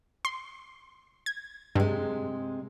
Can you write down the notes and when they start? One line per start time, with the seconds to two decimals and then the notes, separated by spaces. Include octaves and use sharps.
0.25 C6
1.26 G#6
1.76 G2 C3 G#3